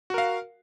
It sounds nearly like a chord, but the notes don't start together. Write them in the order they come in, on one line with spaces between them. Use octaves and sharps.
F#4 A#4 F5